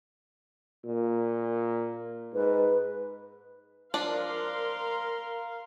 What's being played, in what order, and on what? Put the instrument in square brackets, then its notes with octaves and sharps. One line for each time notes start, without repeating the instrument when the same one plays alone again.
[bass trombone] A#2
[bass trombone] G#2 [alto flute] B4
[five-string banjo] F3 D4 D5 [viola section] A#4 F5 C6